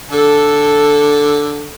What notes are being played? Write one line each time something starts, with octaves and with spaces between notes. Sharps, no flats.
D3 A4